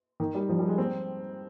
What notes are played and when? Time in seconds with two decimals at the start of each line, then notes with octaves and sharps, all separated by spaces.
0.20 D#3
0.35 G3
0.49 F3
0.59 G3
0.68 G#3
0.78 C4